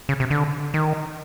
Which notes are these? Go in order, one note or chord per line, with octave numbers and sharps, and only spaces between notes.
C#3
C3
D3
D#3